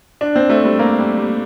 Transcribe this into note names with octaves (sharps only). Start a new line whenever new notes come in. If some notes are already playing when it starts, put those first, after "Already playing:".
D4
C4
A3
G3
A#3
G3
G3